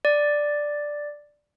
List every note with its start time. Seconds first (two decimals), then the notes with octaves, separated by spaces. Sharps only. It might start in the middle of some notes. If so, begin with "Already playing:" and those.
0.05 D5